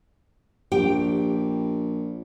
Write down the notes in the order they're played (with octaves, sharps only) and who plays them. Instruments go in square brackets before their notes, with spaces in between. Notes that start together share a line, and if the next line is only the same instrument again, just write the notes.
[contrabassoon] A#1 [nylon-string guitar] G4 G5